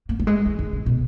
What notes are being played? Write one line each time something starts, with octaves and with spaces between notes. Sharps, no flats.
A#3
G3
G#3
E3
D#3
C#3
B2